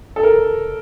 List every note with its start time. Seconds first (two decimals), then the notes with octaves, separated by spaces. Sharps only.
0.16 A4
0.23 A#4